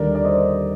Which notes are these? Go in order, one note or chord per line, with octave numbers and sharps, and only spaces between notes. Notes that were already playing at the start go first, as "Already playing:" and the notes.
Already playing: D#2 D3 G3 A#4 D5
D5
C5 D#5